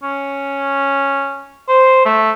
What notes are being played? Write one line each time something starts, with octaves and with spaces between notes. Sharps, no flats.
C#4
C5
A3